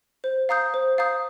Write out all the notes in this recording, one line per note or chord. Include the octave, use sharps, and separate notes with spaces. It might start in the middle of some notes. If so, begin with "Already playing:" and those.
C5
F5 A#5 D#6 G6
C5
F5 A#5 D#6 G6